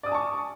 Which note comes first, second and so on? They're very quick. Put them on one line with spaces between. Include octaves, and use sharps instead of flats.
D5 D#6 G#5 A5 C#6